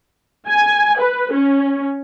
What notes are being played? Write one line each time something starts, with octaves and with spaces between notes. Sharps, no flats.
G#5
B4
C#4